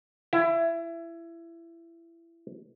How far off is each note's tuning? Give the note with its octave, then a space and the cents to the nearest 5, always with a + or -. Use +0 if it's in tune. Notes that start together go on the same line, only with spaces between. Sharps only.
E4 +20